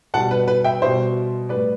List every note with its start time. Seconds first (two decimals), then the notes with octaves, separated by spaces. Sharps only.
0.14 B2 G3 F#5 A5
0.31 B4
0.48 B4
0.64 E5 G5
0.82 B2 G3 C5 E5
1.49 A2 G3 B4 D5